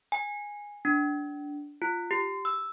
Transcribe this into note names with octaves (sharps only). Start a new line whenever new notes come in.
G#5
D4
F4
G4
E6